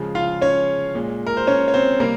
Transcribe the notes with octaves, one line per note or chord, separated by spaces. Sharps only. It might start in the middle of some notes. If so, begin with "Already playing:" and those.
Already playing: C#3 F3 G#3
F4 F5
C#4 C#5
A#2 G#3
A#4
C5
C#4 C#5
C#5
C4 C5
C3 G3 A#3 A#4